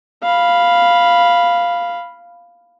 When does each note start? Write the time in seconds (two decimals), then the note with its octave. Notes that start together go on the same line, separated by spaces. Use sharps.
0.23 F5 B5